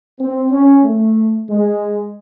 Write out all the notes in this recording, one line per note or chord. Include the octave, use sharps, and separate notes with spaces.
C4
C#4
A3
G#3